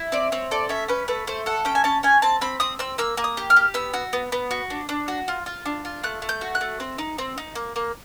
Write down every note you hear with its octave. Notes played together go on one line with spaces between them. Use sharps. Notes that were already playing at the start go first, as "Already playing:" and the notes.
Already playing: E4
C4 D5
C4 C#5
A4 D5
C#4 E5
C#4 B4
A3 B4
A3 C5
A4 F#5
C#4 G5
G#5
C#4 A5
C#4 G#5
C4 A5
C4 B5
C4 D#6
C4 E6
A#3 E6
A#3
D#6
G4
F6
G4
B3 E6
F#4
B3
B3
F#4
D4
D4
F#4
F4
F4
D4
F4
A3 F#6
A3
G6
F#4
F#6
A3
C4
D#4
C4
D#4
A#3
A#3